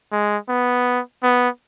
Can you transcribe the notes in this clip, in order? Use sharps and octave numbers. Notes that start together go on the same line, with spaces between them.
G#3
B3
B3